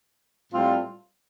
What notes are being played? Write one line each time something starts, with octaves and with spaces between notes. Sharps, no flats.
A2 G3 C4 F4